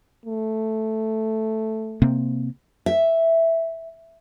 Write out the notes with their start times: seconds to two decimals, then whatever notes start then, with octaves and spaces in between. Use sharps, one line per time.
0.26 A3
2.02 C3 A#3 C4
2.86 E5